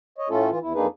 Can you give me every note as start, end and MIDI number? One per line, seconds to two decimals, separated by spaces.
0.18 0.29 73
0.18 0.29 75
0.29 0.50 45
0.29 0.50 57
0.29 0.50 61
0.29 0.50 65
0.29 0.50 69
0.50 0.59 52
0.50 0.59 65
0.62 0.73 40
0.62 0.73 64
0.75 0.87 41
0.75 0.87 58
0.75 0.87 62
0.75 0.87 63
0.75 0.87 68
0.75 0.87 71